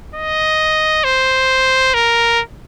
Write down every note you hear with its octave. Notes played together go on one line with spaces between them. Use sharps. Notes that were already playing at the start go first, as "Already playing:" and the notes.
D#5
C5
A#4